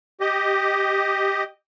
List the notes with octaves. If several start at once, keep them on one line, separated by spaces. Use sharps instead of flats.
G4 D#5